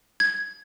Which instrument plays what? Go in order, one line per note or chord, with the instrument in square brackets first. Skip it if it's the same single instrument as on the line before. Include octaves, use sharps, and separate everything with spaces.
[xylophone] G#6